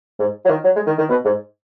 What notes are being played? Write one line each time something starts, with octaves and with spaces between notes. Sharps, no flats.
G#2
F#3
D#3
F#3
G#3
D#3
D#3
B2
G#2